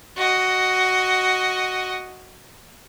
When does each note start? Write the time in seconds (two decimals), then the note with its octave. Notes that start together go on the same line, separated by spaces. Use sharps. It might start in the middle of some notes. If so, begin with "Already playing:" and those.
0.16 F#4 D#5